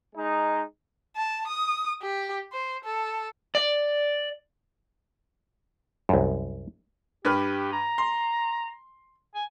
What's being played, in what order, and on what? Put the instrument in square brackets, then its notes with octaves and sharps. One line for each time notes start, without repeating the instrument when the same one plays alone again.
[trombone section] G#3 D#4
[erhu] A5
D#6
G4
C5
A4
[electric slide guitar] D5
[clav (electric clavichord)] C2 F#2
[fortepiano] G2 B4 F6 [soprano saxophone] G4
[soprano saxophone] A#5
[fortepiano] C6
[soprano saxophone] G#5